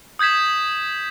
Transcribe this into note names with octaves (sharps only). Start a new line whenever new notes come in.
D#6 G6 G#6 B6 E7